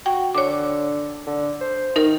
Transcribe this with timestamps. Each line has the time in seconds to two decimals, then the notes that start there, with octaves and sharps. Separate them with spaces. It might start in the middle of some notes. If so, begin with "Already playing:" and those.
0.06 F#4 G5
0.34 D3 C#5 D6
1.26 D3
1.61 C5
1.96 D#3 D#4 A#4